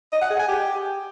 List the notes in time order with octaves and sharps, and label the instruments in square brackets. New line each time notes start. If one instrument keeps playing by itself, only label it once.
[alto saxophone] D#5
F#5
G#4
G#5
G4